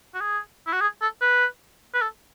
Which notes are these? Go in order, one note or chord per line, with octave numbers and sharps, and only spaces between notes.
F#4
G#4
E4
F#4
G#4
A4
B4
B4
A4